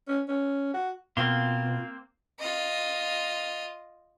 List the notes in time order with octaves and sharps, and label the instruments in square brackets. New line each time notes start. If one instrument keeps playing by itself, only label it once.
[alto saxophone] C#4
C#4
F#4
[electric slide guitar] B2 [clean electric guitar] A#3 C4 [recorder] F4 [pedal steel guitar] F5 C6
[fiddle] F4 D#5